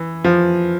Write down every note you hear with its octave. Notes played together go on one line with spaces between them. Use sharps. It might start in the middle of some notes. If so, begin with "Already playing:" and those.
Already playing: E3
F3